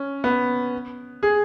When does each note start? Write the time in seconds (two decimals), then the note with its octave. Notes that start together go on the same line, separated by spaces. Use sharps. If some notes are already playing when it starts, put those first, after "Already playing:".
Already playing: C#4
0.24 B3
1.23 G#4